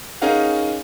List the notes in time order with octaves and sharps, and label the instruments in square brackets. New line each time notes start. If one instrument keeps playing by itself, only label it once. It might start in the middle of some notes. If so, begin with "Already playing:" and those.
[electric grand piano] C#4 D#4 G#4 A#4 F5 F#5